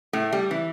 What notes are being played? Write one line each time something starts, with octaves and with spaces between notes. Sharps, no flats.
A2 A3
G3
E3